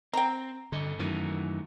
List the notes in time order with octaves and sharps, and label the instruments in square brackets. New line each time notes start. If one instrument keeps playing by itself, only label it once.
[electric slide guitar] C4 [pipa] G5 A#5
[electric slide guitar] G2 A4 D#5 [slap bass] D3
[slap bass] F#2 D#3 E3 [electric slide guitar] A3 D#4 F#4